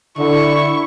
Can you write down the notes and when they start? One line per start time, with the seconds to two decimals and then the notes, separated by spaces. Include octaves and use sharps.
0.18 D3 E4 C#6